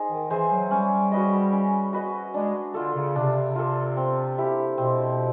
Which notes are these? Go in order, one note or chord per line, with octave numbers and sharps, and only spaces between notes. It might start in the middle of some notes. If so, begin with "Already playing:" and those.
Already playing: D#4 G#4 C5
D#3
E3 G#4 C5 E5
F#3
G3 C#4
F#4 B4 D#5
C#4
F#4 B4 D#5
G#3 D4
D3 F4 A4
C#3
C3 D4
F4 A4
C4
E4 G4
B2 C4